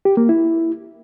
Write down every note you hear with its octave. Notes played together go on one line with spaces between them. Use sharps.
G4
A#3
E4